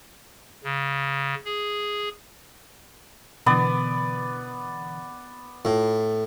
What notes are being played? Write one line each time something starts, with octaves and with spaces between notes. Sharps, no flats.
C#3
G#4
B2 D3 E3 B3 B4 D5
A2 F4